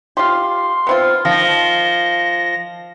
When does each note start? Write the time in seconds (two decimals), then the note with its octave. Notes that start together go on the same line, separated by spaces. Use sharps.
0.17 F4 G4 C6
0.87 B3 C4 F4
1.25 D#3 F3 A#6